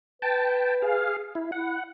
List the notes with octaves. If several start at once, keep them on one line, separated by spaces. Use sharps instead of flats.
B4 G5 A5
G#4 F5
E4
E4 F#5